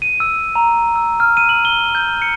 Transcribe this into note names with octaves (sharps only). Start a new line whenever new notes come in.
D#7
E6
A#5
E6
F6
D#7
F#7
G7
G6
C#7